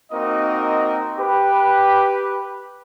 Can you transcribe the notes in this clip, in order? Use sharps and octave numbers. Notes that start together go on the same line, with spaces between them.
A#3 C4 D#4 F#4 A#4 D#5
G4 B4